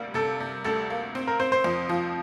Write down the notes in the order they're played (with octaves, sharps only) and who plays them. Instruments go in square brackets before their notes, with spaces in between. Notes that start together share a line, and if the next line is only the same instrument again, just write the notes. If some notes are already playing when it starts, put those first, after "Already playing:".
Already playing: [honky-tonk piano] D2 C3 G3 A#3
[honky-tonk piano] C3 [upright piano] A4
[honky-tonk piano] C3
[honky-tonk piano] D2 [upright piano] A4
[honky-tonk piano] A#3
C4
[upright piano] A#4
[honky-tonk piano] C4 [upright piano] C5
[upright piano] C5
[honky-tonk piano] F2
F3